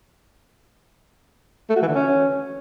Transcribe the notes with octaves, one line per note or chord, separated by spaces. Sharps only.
A3
F#4
E3
D3
C#4